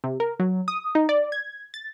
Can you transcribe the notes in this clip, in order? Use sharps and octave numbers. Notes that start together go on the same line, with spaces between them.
C3
A#4
F#3
D#6
D#4
D5
G#6
A6